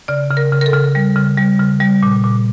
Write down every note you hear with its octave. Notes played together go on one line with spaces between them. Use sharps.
C#3 D5
C#3
A#4
C#3
A#4
A4
C#3
G3
C#3
G3
C#3
G3
A#2
A#2